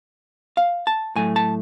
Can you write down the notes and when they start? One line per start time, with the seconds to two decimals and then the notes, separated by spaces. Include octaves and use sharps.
0.57 F5
0.87 A5
1.16 A2 F#3 A3 G#5
1.36 A5